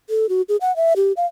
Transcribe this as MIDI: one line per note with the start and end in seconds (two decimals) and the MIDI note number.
0.10 0.29 69
0.29 0.42 66
0.49 0.56 68
0.61 0.74 78
0.76 0.93 76
0.96 1.12 67
1.17 1.26 77